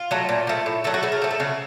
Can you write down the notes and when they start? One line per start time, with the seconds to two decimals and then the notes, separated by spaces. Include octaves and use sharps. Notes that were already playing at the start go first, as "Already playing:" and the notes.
Already playing: F4
0.11 F#3 A3
0.29 A#2
0.47 F3 A3
0.66 A2
0.84 F#3 A3 A4
0.94 F#4
1.03 C#3 A4
1.12 A#4
1.22 F3 A3
1.31 A4
1.40 C#3 F#4